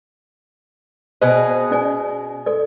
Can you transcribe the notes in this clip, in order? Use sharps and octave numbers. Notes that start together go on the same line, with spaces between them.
B2 G#4 C5 D#5
C#4 D5 G#5
A4 D5